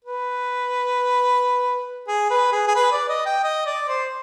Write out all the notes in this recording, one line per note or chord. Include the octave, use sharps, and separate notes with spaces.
B4
G#4
B4
G#4
G#4
B4
D5
D#5
G5
D#5
D5
C5